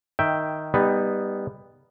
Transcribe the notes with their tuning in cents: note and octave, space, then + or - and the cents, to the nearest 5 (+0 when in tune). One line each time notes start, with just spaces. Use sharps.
D#3 +0 E5 +0 G5 +0
G3 +15 B3 +0 D#4 +0